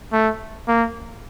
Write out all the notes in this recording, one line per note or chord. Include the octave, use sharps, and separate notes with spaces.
A3
A#3